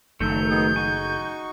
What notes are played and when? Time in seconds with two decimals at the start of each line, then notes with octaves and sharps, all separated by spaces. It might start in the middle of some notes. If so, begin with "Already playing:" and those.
0.20 F#1 D#3 F#3 A3 A4 G6
0.50 B3 D#4 G#4
0.76 D#4 F#4 G#5 C#6